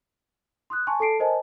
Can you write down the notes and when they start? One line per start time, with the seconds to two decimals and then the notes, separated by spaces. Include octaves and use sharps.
0.70 C6 D#6 F#6
0.87 G#5 A5 C6 C#6
1.00 A4 A5 C7 D7
1.19 A#4 C5 D#5 G#5 A5